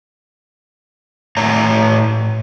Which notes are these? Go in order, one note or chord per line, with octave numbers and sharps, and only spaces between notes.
A2 C#5 A#5